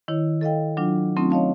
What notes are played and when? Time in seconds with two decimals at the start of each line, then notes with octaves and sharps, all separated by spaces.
0.08 D#3 E4 C#5
0.41 A4 D#5 F5 G5
0.77 F#3 D4 F4
1.17 F#3 A3 C4 C#4 D#4 F4
1.30 C#5 D#5 F5 A5